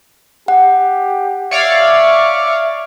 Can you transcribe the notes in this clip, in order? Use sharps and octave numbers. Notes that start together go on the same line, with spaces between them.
G4 F#5
C#5 D5 E5 F5